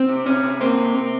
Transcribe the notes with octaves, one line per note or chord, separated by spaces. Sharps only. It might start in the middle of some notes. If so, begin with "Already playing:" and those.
Already playing: C4
C3
C3 C#4
C3
A#3 C4
C3
C3